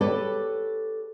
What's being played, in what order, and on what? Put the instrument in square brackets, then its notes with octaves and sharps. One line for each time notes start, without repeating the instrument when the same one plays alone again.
[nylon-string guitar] G4 A4 B4 C#5 D5